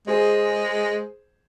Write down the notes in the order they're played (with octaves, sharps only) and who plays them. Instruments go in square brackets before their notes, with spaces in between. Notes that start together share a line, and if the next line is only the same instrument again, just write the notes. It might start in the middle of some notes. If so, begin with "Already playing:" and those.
[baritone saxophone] G#3 [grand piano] G#4 C5